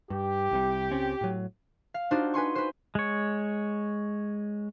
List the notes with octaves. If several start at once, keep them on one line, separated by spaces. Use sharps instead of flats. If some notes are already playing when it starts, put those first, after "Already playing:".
G2 G4
C2 C3 G3
C#2 C4 C#4
A2 F#3
F5
D4 D#4 F4 F#4 C5
B4 G#5 C6 C#6
B4 C5
G#3 C#5